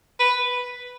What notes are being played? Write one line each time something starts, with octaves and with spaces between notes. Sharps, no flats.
B4